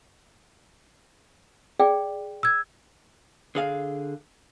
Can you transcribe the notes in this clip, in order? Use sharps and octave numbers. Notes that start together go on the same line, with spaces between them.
G#4 D5 G5
E6 G#6
D3 G#4 F5